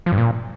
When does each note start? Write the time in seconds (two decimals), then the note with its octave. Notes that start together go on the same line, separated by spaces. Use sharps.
0.06 F3
0.12 G2
0.18 A#2